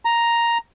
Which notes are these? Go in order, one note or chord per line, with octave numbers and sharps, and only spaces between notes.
A#5